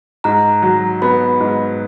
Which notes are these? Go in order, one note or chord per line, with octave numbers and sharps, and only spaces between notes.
G#2 A#5
F#3
B3 B5
G#2